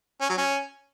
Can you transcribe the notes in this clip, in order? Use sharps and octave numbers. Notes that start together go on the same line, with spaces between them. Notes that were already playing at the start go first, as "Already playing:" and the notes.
C#4
F#3
C#4